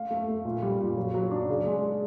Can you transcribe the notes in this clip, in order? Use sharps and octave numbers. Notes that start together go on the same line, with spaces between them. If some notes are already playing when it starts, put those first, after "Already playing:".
Already playing: A3 F5
A3
A3
A#2
G3
A#2
F#3
F#3
D4
C#3
G#3
G#3